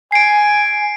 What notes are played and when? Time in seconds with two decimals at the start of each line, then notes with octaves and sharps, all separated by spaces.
0.12 G#5 C7 D7